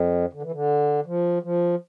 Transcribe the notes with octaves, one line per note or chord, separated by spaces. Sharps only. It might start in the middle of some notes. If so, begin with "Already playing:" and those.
Already playing: F2
D3
E3
D3
F3
F3